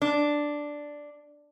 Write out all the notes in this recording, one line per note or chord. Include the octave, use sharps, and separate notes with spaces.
D4